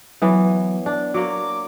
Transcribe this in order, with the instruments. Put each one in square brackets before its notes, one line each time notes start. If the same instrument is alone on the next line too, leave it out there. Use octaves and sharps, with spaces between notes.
[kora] E3 B3 [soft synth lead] F#3
[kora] D4
[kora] F#3 A#3 [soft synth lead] D6